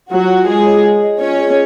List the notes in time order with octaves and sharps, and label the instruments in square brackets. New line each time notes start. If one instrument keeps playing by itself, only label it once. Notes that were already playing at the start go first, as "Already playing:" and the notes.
[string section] F#3 F#4 [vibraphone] F4
[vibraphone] F4
[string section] G#3 G#4 [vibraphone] F4
[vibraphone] C#5
D#5
D#5
[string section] C#4 C#5 [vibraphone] F4
[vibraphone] G#4